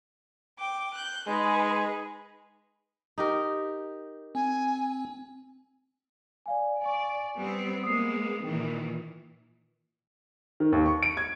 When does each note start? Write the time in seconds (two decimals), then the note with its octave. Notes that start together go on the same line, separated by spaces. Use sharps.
0.57 G5 D6
0.94 F#6 G6
1.27 G#3 D#4 G#4 B4
3.18 D#4 G4 A#4
4.35 C4 G#5
6.46 D5 F5 G#5
6.82 D5 G#5 C#6
7.38 G3 B3 C4
7.84 G#3 A#3 B3 D#6 C7
8.44 A#2 D#3 E3 G5
10.60 D#3
10.72 D#2
10.86 C#6
11.03 D7
11.17 G#6